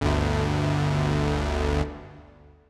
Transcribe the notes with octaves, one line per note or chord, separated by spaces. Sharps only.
G1 D2